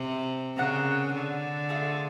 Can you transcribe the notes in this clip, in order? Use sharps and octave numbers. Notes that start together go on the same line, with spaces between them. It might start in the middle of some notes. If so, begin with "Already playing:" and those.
Already playing: C3
C#3 F#4 A#4 D5 F#5
D3
A3 C4 F4 G#4